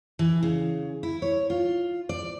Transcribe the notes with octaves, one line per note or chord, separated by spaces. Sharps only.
E3
C#3
E4
C#5
F4
D5